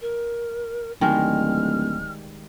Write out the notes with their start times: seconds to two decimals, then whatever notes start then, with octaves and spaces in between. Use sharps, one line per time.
0.01 A#4
1.01 D1 D#3 G3 G#3 F6